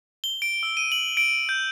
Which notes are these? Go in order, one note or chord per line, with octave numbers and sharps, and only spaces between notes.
G7
D7
E6
D#7
F#7
D7
G6